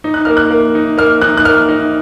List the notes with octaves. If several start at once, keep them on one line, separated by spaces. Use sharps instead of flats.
D#4
F#6
A#3 F6
F#6
A#3
D#4
A#3 F6
D#4 F#6
F#6
A#3 F6
D#4